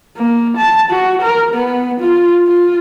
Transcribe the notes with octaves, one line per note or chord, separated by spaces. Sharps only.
A#3
A5
F#4
A#4
B3
F4
F4